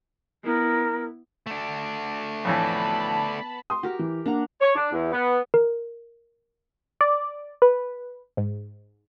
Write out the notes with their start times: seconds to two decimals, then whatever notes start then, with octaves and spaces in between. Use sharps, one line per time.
0.44 B3 E4 A#4
1.46 A3 D4
2.45 F2 A2 E3 B3 A5 B5
3.70 C6 D#6
3.83 F#4 G4 A#4
3.99 E3
4.26 A#3 D4 F#5 A#5
4.61 C#5
4.75 D4
4.92 E2
5.12 B3
5.54 A#4
7.01 D5
7.62 B4
8.37 G#2